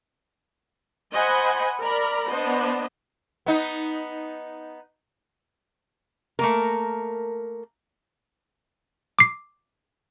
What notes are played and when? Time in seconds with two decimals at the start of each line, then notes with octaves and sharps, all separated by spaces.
1.13 C5 D#5 F#5 G#5 B5
1.81 A#4 D5 A#5 B5
2.30 B3 D4 C5 D#5
3.46 B3 D#4
6.39 A3 A#3 A#4
9.19 D6 C7